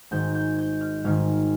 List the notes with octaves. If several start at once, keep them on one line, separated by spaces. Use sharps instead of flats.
G#1 G#2 D#3 G6
G6
G6
F6
G#1 G#2 D#3 F6